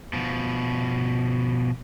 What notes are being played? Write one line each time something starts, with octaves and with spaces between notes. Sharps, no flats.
B2 F3